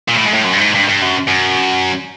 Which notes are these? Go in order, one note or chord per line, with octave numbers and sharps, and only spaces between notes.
A#2
A2
G#2
A2
F#2
G2
G#2
G2
G2
F#2
F#2